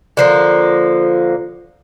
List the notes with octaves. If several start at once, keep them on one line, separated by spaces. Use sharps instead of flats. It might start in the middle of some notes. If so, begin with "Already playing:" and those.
D3 F3 A#3